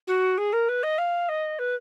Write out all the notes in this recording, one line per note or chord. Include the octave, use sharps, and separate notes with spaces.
F#4
G#4
A#4
B4
D#5
F5
D#5
B4